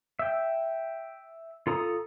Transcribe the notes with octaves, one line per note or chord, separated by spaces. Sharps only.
E5 G5
F4 A4 A#5 D#6